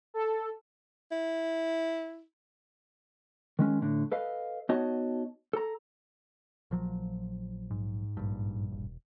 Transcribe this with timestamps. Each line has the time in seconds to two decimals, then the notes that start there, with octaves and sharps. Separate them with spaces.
0.14 A4
1.12 E4
3.59 D#3 G#3 C#4
3.82 A2 D3
4.12 A4 B4 D#5 F5
4.69 B3 D#4 F#4 C#5 D#5 A5
5.53 A4 A#5
6.71 A#1 F3 F#3
7.70 G#2
8.17 A#1 G2
8.71 E1